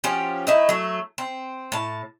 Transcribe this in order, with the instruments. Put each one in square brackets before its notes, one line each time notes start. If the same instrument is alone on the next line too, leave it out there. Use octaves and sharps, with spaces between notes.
[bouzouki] F3 C#4 F#4 G4
A3 D#4 E4
F#3 A3
C4
A2 A5